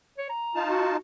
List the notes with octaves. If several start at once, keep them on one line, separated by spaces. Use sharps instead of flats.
C#5
A#5
D#4 F4 A5
F#4